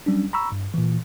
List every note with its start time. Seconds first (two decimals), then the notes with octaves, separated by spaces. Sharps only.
0.06 F#3 G3 C#4 D4
0.33 A#5 B5 C#6 E6
0.52 G2
0.74 A#2 E3